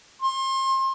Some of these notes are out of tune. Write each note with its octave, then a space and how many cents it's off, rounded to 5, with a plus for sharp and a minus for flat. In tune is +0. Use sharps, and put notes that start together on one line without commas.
C6 +30